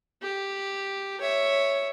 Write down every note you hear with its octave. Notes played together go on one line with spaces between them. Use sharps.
G4
C#5 E5